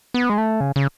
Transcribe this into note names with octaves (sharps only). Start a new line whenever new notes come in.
B3
G#3
A3
C#3
C#3